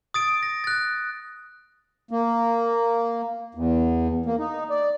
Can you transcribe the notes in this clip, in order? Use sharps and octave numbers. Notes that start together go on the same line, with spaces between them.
D#6 A6 D7
A#6
F#6 A6
A#3
E2
A#3
D#4
D5